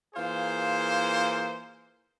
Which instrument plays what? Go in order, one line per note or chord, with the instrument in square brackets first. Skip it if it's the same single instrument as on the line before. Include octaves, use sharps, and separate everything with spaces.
[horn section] E3 A#3 F4 G#4 C5